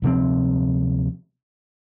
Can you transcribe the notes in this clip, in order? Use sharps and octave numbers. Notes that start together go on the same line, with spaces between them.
D2 C3 F3 C4